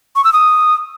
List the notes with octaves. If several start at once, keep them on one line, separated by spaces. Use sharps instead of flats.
C#6
E6
D#6